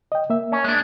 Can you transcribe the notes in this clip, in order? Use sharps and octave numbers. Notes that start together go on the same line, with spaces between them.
D#5 G5
A#3 E5
C#4
G#3 D4